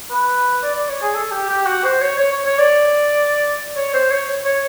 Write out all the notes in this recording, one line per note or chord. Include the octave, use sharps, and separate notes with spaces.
B4
D5
D5
C#5
G#4
A4
G4
G4
F#4
C5
C#5
C#5
C#5
C#5
D5
C#5
C5
C#5
C#5